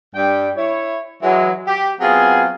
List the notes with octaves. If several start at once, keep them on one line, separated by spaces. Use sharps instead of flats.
G2 G3 G5
E4 C#5
E3 F#3 G#3
G4
F#3 B3 C4 F4 G#4